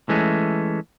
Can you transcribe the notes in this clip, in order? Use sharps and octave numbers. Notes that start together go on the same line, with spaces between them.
E3 G#3 A3 C#4